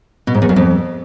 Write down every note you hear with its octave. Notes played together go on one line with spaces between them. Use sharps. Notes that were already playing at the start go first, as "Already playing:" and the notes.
B2
G#2
E2
F#2
F2